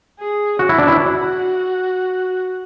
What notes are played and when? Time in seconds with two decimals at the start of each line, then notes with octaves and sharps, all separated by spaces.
0.19 G#4
0.59 C#4 F#4
0.69 E4
0.79 D4
0.87 E4
0.98 F#4